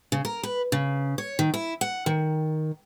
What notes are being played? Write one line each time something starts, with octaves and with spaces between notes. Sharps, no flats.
C#3
A#4
B4
C#3
C#5
D#3
E4
F#5
D#3